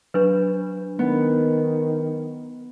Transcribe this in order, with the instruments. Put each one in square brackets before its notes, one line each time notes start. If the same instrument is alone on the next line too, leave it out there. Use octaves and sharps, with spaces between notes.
[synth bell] F#3 D4 [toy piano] B4
[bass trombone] D#3 [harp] B3